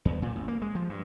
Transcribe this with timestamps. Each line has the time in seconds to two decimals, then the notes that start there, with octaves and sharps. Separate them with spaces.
0.05 E2
0.22 A#2
0.36 A1
0.48 A#3
0.62 G#3
0.75 F3
0.89 G2